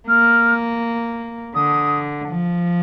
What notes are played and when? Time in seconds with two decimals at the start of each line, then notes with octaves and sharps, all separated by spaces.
0.08 A#3 F6
1.54 D3 D#6
2.29 F3